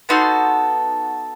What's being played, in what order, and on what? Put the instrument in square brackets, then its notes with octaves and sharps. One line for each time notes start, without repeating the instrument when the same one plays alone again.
[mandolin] B3 D#4 F#4 A4 C6